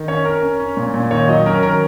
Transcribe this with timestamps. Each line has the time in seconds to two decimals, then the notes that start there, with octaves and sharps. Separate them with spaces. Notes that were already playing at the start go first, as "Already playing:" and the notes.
Already playing: D#3
0.08 C#4 C#5
0.25 C#4 A#4
0.42 C#4
0.60 C#4
0.77 A#2
0.94 A#2
1.11 D#3 C#5
1.28 F#3 D#5
1.46 C#4 A#4
1.63 D#3 A#4